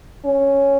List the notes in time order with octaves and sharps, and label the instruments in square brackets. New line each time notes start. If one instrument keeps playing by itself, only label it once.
[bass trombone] C#4